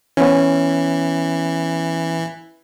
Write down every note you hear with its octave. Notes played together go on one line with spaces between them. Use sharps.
E3 B3 C#4